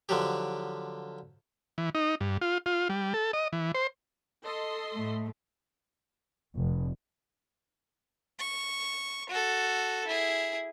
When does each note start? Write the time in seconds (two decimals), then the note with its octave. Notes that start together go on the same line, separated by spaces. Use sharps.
0.09 D3 F3 F#3 G4
1.78 E3
1.95 D#4
2.21 G2
2.41 F4
2.66 F4
2.89 G3
3.14 A4
3.33 D#5
3.53 E3
3.75 C5
4.42 A4 D#5 C6
4.93 A2 A3
6.56 F1
8.39 C#6
9.29 F#4 A4
10.07 E4 G#4